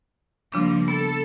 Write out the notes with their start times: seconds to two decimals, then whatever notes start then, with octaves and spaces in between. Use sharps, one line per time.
0.52 C#3 F3 G3 A#3 D4 D6
0.88 B3 A4